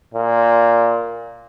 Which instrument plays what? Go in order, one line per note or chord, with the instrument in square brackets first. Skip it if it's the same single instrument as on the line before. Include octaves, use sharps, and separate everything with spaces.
[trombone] A#2